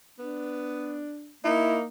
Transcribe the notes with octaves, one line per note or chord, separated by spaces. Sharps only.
B3 D4
A#3 D#4 E4